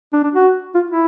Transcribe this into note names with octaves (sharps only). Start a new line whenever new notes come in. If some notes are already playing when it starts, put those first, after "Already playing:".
D4
D4
F#4
F4
E4